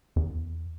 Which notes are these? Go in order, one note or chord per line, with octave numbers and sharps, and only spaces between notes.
E2